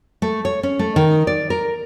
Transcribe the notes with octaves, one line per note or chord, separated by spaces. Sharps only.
A3
C#5
C#4
A3
D#3
D5
A#4